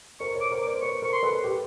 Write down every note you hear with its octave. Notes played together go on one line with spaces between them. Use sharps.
A#4 C5 C#6
B4 C#5
D6
A#4 C5
D6
C5 D5
B4 C#5 C#6
A#4 C5 C#6
C6
A4 B4
G4 A4